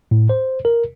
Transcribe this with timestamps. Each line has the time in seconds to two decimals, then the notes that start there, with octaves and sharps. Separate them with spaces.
0.11 A2
0.29 C5
0.65 A#4